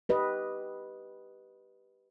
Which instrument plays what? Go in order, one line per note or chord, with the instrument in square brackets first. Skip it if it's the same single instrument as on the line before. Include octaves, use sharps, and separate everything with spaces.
[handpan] G4 B4 D#5